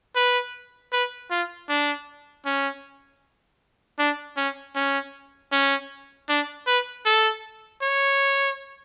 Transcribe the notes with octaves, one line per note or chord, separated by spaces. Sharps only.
B4
B4
F4
D4
C#4
D4
C#4
C#4
C#4
D4
B4
A4
C#5